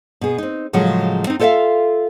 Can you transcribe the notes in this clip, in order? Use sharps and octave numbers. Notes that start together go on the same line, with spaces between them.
B2 G#4
C4 D#4
A2 C#3 F3 F#3 G#3 F#4
C4 D#4
F4 A4 C5 D5 E5 F5